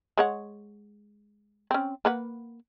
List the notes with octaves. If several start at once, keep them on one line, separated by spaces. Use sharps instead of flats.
G#3 C#5 F#5
C4 C#4
A#3 B4 F#5